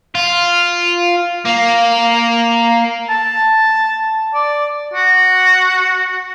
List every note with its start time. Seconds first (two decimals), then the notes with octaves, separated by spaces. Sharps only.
0.15 F4
1.45 A#3
3.09 A5
4.34 D5
4.94 F#4